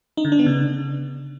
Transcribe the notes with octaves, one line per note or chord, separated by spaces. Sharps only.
D#4
D3
D4
B3
C#3